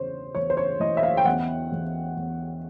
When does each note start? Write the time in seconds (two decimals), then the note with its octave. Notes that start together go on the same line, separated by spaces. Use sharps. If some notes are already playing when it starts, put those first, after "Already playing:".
Already playing: E2 C#3 C5 C#5
0.35 E2 C#5
0.50 C5
0.57 C#5
0.80 E3 D#5
0.97 E5
1.03 F5
1.17 G5
1.25 E2 F#5
1.72 E2
2.17 E2